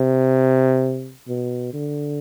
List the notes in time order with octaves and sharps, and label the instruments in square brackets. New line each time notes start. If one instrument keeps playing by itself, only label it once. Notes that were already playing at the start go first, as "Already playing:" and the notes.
Already playing: [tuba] C3
B2
D3